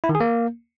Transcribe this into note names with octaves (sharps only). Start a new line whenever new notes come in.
E4
D#3
G#4
A#3